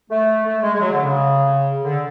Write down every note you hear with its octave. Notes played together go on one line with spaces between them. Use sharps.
A3
A3
G#3
G#3
F#3
D3
C#3
D3